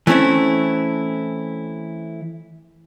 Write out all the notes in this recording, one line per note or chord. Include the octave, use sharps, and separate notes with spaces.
E3 A3 C4 C#4 E4